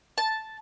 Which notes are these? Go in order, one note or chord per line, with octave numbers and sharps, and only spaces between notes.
A5